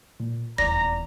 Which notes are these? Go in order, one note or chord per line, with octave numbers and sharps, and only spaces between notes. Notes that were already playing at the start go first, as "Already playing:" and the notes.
A#2
D#1 E2 D5 A#5 A#6